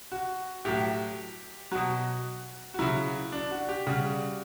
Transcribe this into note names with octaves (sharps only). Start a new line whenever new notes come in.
F#4
A2 F#3 G4
B2 F#3 F#4
F#4
C#3 F#3 E4
D4
F#4
G4
C#3 G3 F#4